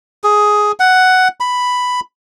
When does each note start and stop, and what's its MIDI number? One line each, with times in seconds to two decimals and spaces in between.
0.24 0.72 68
0.80 1.28 78
1.40 2.00 83